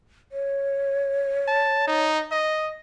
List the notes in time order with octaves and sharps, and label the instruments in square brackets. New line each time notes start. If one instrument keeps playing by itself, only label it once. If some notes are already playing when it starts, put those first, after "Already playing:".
[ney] C#5
[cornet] A5
D#4
D#5